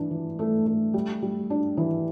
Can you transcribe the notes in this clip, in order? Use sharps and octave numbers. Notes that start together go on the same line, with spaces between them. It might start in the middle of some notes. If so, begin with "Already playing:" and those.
Already playing: E3 D4
E3
A3
A3
G3
G3
D4
E3